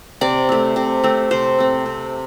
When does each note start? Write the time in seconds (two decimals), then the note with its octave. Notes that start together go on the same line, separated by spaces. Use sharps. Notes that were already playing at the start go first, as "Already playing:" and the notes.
0.21 C3 D5
0.49 A3 C4
0.76 C3
1.04 A3 C4
1.31 C3 C5
1.58 A3 C4
1.86 C3